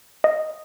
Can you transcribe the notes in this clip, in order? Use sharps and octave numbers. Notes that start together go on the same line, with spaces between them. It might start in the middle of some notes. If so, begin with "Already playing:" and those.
D#5